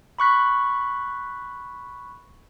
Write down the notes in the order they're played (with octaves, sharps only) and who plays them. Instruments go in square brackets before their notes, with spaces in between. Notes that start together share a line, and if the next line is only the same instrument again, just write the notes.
[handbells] B5 C#6 F#6 B6